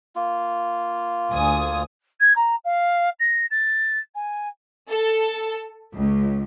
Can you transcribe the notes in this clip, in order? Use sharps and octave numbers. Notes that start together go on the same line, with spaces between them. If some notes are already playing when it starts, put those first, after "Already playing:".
A#3 F4
D2 G#5 D#6
G#6
A#5
F5
A#6
A6
G#5
A4
C#2